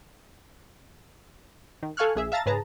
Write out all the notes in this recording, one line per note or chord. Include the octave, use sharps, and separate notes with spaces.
D#3
A4 F5 G#5 C#6 F6 F#6
A#1 G#4 E5
E5 F5 A5 A#5 A6
G#2 C#3 G#4 B4 A5 A#5